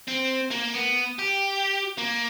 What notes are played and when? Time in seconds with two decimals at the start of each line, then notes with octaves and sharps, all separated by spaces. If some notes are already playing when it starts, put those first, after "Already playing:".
0.08 C4
0.51 A#3
0.74 B3
1.19 G4
1.98 A#3